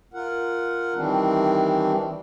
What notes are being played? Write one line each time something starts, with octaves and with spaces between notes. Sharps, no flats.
F4 A#4 F#5
D#3 E3 G3 C4 D4